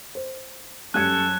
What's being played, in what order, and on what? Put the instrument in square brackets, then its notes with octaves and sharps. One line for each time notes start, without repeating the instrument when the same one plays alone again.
[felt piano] C5
[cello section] F#2 C#4 [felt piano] G3 G#6 C#7 [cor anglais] A4 [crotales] F#6